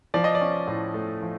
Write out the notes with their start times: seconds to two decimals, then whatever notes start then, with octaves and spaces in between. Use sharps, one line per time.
0.14 F3 D5
0.24 D#5
0.35 D5
0.41 C#4
0.67 A2
0.94 A3
1.22 F3